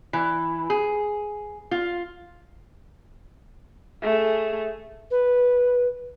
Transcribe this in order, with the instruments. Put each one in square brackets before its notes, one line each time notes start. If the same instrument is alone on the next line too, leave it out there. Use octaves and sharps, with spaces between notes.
[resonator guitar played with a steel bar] E3
G#4
F4
[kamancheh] A3 G#4
[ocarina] B4